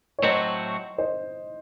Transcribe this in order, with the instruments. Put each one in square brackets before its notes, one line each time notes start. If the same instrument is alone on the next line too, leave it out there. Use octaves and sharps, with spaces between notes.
[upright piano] C#5
[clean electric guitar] A2 F#3 A3 C4 F#4 [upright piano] C5 D#5
[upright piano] C5 D#5